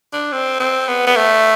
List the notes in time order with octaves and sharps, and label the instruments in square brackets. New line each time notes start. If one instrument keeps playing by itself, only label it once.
[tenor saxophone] D4
C4
C4
B3
B3
A3